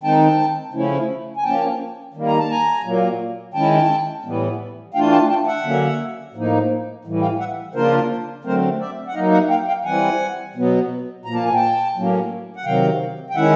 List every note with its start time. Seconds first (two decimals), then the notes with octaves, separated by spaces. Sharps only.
0.03 D#3 G#3 C4 D#4 G5 A5
0.73 C#3 F3 A3 C#4 E4
1.37 G#5
1.43 F3 A#3 C#4 G5 A5
2.14 D#3 G3 A#3
2.27 A#5
2.39 A5
2.51 G#5 A#5
2.84 A#2 F#3 A#3
3.54 D#3 G#3 C#4 E4 G5 A5
4.24 A2 E3 G3 B3
4.94 E3 A3 D4 F4 F5 G5
5.11 G5 A5
5.29 G5 A5
5.46 E5 F#5
5.64 D3 F#3 A#3 C#4
6.34 A2 F3 A#3 D#4
7.05 A2 E3 G3
7.22 F5 G5
7.39 E5 F#5
7.74 C#3 F3 A#3 D4 F4 A#4 C5
8.44 D3 F#3 A3 C4 A#4 C5
8.80 D5 E5
9.08 F#5
9.14 F#3 A#3 D#4 D#5 F5
9.32 E5 F#5
9.50 F5 G5
9.67 F5 G5
9.85 E3 G3 C4 F#5 G#5
10.55 B2 F#3 B3
11.25 A#2 F3 A#3 A#5
11.35 A5
11.45 G#5
11.55 G5 A5
11.95 A2 F#3 A#3 C#4
12.56 F#5
12.65 C3 D#3 F#3 F5 G5
13.30 G5
13.35 D#3 G#3 C#4 E4 E5 F#5